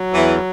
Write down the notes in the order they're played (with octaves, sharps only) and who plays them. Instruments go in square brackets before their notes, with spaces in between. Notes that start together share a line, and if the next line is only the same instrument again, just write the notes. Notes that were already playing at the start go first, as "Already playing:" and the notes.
Already playing: [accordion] F#3
[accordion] E2 [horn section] E3